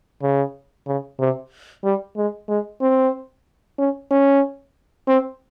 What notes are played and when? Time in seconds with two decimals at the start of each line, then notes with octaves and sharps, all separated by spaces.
0.22 C#3
0.87 C#3
1.20 C3
1.84 G3
2.17 G#3
2.49 G#3
2.81 C4
3.78 C#4
4.11 C#4
5.08 C4